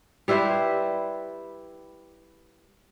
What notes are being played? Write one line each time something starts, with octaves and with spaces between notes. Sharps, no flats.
G3 E4 B4 C5